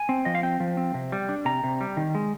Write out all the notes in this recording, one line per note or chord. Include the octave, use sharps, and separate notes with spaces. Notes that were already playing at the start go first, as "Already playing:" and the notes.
Already playing: G#5
C4
F3 D#5
F5
C4 G5
F3
C4
C3
G3
D4
C3 A#5
C3
G3
D#3
G#3